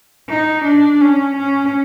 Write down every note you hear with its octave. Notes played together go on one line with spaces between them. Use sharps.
D#4
D4
C#4
C#4